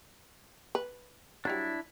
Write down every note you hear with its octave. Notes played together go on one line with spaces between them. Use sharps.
B4
F#3 G3 D4 E4